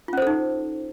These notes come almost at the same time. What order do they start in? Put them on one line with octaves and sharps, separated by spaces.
F4 C#4 C5 A4 D#4